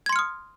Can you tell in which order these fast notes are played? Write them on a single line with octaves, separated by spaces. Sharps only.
G#6 C6 C#7 F6 D#6